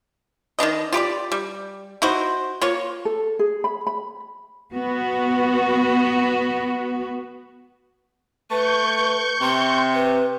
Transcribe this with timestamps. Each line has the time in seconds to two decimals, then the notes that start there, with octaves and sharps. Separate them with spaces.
0.59 D#3 C4 D4 D#5
0.93 F4 G4 B4 D5
1.32 G3
2.02 D#4 E4 F#4 C5
2.62 A#3 F4 C#5
3.05 A4
3.39 G#4
3.64 B5
3.87 B5
4.72 B3 F#4
8.51 A3 B4 C#6 G6
9.41 C3 C6
9.94 B4